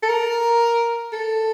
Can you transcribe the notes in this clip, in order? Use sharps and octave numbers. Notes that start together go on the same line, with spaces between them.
A4
A#4
A4